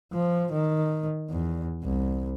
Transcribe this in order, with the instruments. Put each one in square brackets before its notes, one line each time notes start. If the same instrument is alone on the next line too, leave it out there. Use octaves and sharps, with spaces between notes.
[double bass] F3
D#3
E2
C2